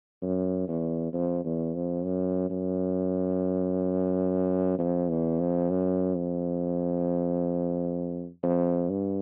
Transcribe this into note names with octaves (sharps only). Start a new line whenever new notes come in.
F#2
E2
F2
E2
F2
F#2
F#2
F2
E2
F2
F#2
F2
F2
G2